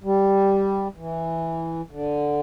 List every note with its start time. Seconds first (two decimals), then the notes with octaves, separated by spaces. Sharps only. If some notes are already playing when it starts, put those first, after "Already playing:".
0.04 G3
0.97 E3
1.91 D3